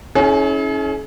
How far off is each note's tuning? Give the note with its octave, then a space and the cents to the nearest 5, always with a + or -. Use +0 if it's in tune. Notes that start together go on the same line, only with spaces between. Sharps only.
C#4 +0 E4 -35 G#4 +45